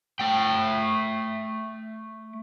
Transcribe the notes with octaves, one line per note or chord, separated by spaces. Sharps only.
A3 G5